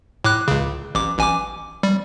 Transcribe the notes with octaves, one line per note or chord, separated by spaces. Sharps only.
A2 D6 F#6
C#2 C#3
A1 D6
A1 G#5 D6
G3